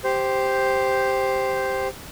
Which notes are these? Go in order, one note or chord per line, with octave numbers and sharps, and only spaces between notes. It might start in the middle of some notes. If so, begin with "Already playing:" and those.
G4 C5